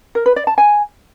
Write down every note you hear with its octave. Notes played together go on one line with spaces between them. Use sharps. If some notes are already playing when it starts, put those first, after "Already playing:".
A#4
B4
D5
A5
G#5